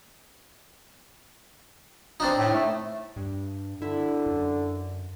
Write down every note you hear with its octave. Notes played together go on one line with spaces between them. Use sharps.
C4 D4 D#4
A2
A3
G2
D3 E4
F#2